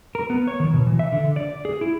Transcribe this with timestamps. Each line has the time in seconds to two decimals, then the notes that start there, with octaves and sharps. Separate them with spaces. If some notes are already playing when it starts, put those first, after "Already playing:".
0.15 A#4
0.30 B3
0.48 C#5
0.60 D#3
0.73 B2
0.87 E3
0.99 E5
1.12 D3
1.36 D5
1.65 G#4
1.81 E4